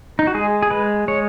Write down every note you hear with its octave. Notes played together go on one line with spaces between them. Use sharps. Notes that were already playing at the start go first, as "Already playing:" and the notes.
D#4
F#4
G#3 G#4
G#4
G#3 B4
G#3 C#5